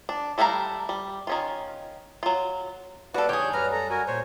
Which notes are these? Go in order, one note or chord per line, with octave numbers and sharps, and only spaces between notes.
D4
G3 A3 E4 F5 A#5
G3
D#3 C#4 F4
F#3 F4
G3 A#3 F#4 A4 B4 D5 F5
F2 D3 D#4 G4 G#4 C#5 G6
F#2 G3 B4 C#5 A#5 F6
A4 A#5
F#4 A#4 G#5
A#2 C5 C#5